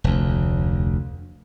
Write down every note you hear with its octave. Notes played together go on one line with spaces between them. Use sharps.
F1 D2